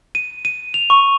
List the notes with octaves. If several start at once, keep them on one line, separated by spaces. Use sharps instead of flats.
D#7
D#7
F7
C#6